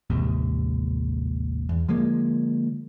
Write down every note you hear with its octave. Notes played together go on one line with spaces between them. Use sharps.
A1 D#2 G#2 C3
E2
D3 F3 G#3 A#3